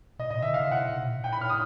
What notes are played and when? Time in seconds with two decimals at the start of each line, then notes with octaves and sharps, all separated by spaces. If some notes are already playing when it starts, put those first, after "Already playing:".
0.19 B2 D#5
0.31 A#2 D#5
0.42 D3 E5
0.54 C#3 F5
0.71 C3 F#5
0.89 B2
1.06 A#2
1.24 A#2 G5
1.33 B5
1.41 F6
1.50 D#6